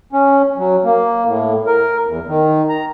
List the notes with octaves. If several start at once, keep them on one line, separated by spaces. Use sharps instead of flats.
C#4
F#3
A#3
A2
A#4
E2
D#3
A#5